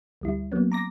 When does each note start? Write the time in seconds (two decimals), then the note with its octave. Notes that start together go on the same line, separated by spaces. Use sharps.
0.21 D2 G3 E4
0.52 F#3 A#3 B3 C#4
0.72 A#5 D6 A#6